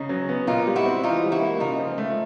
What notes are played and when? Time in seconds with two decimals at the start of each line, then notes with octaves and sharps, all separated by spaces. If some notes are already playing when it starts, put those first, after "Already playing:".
Already playing: C#3 C#4 D#4
0.09 F#3
0.29 B3
0.47 A#2 D#4 F4
0.67 G3
0.76 E4 F#4
0.86 C4
1.03 E3 D#4 F4
1.23 G3
1.32 E4 F#4
1.42 A#3
1.60 C#3 D#4 F4
1.79 F3
1.98 A3